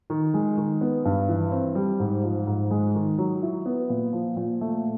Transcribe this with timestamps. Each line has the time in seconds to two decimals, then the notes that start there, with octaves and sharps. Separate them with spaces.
0.10 D#3
0.34 G#3
0.57 D#3
0.81 B3
1.05 G2
1.29 E3
1.52 C4
1.75 G3
2.00 G#2
2.23 F3
2.47 G#2
2.71 G#3
2.95 D#3
3.18 F#3
3.43 E4
3.66 B3
3.90 A#2
4.13 F3
4.37 A#2
4.61 A3